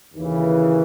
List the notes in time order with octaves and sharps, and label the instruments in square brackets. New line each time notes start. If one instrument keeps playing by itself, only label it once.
[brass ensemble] D#2 C#3 E3